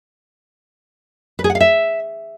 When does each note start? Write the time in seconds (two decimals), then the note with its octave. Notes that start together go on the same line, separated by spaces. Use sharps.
1.39 B4
1.44 G#4
1.50 F#5
1.55 F5
1.60 E5